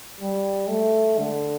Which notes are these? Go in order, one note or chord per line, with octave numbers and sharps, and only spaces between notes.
G3
A3
D3